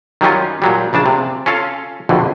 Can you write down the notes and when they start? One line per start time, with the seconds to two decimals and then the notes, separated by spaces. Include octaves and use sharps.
0.21 D#3 F#3 G3 C#4 F4
0.62 A#2 F#3 G3
0.93 A#1 C#3 D4 A5
1.06 C3
1.46 C#4 F4 A4 F5
2.09 A#1 F2 B2 D3